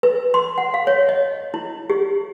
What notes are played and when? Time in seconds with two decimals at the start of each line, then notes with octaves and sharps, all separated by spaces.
0.03 B4
0.34 C6
0.58 F#5
0.74 F5
0.87 C#5
1.09 D#5
1.54 E4
1.90 G4